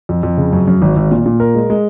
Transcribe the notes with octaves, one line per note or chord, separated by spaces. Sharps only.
F2
F2
C#3
F#2
F#2
G#1
G#1
A#2
A#2
A#4
G#3
G#3